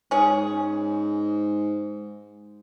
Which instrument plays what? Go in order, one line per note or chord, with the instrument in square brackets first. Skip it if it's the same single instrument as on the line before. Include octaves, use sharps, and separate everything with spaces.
[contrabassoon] G#2 [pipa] C#4 G#4